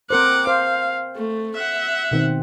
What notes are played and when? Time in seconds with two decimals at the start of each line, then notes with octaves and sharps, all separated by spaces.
0.10 C4 A#4 C5 F#5 D6
0.47 C5 F5
1.16 A3
1.56 E5 F#5
2.11 B2 D#3 C4